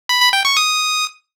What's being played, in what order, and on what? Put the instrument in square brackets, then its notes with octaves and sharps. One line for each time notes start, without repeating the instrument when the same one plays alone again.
[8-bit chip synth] B5
B5
G5
C#6
D#6